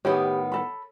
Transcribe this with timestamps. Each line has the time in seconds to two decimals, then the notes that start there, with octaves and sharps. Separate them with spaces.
0.05 A2 D#3 B3 G4 C#5
0.52 A4 B5